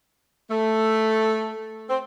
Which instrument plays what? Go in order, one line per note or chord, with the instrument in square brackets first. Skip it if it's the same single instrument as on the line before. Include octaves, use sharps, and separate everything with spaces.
[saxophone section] A3
C4